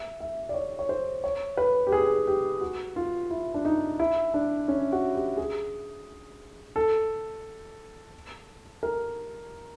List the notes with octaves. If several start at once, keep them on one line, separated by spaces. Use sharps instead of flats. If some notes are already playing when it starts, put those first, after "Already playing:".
Already playing: E5
E5
D5
C#5
C#5
C5
C#5
B4
G4
G#4
G4
F#4
F4
E4
D4
D#4
E4
D4
C#4
F#4
G4
G#4
A4
A#4